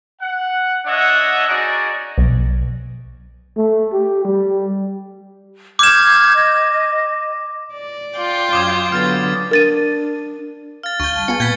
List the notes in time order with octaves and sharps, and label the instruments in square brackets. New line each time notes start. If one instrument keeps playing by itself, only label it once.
[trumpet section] F#5
D4 C#5 D#5 E5 F#5
C#4 D#4 F#4 G#4 D5 D#5
[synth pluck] B1
[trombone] A3
G4
G3
[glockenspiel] D6 E7 [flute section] F6 G6 G#6
[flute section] D#5
[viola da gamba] D5
[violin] F4 G5
[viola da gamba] F#2 [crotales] D6 D#6 G#6
[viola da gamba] D3 F#3 B3 [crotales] F6 A6
[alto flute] D4 [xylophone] A#4 A6 D#7
[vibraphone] F5 [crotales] F6 A6
[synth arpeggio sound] D2 G6 [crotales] C#6 G7
[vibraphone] G3 A5
[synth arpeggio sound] B3 F4 G#4 [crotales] C#7
[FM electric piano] A#2 [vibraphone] G3 B3 B4 [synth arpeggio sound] G5 [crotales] G#6 A6 B6